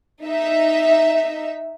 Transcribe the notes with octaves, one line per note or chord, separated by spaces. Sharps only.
D#4 E5